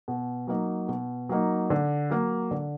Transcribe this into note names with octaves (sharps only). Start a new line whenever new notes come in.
B2
F#3 A#3 D#4
B2
F#3 A#3 D#4
D3
F#3 A#3
D3